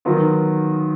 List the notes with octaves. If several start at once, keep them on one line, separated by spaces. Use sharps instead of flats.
D#3 F#3 B3 F4